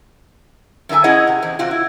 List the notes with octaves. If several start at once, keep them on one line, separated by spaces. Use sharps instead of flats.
F#2 D3 D4 E5 G#5
C#4 E4 G#4 D#5 F#5
C3
E2 C4
C3 C4 F4 F#4
E4